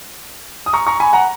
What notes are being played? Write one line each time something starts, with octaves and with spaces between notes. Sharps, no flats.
D#6
A#5 C#6
A#5 C#6
G#5 B5
F#5 A#5